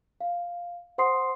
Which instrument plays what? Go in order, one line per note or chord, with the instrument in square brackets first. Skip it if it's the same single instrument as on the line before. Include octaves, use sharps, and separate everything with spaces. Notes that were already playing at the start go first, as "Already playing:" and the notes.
[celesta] F5
C5 F#5 C6 D#6 C7